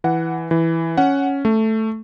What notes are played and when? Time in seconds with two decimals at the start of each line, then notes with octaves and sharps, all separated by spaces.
0.04 E3 F#5
0.51 E3
0.97 C#4 F#5
1.45 A3